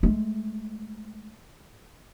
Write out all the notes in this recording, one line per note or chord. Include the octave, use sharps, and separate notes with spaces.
G#3 A3